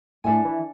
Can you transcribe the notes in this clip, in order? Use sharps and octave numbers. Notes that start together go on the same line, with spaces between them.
A2 D4 A4 E5 G#5
E3